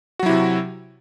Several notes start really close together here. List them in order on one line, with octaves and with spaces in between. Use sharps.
F#4 F#3 E4 C3